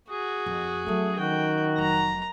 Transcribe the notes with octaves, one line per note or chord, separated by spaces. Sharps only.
F#4 G#4
F2
F#3 A3 C#4
D#3 F#4 G5
F1 F#3 A#5